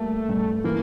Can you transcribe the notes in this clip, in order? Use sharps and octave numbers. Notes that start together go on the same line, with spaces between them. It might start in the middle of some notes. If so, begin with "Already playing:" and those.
Already playing: G3 A3 A#3
G2
E3 A#3